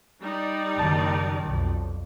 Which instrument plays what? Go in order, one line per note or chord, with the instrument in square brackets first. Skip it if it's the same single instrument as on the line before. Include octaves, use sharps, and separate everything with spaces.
[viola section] G3 D#4 D5
[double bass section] F#1 D#3 [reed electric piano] A5
[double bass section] B1 F2